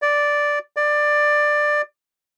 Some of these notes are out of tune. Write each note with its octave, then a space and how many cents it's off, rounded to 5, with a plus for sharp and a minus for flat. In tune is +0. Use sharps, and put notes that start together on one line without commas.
D5 -5
D5 +15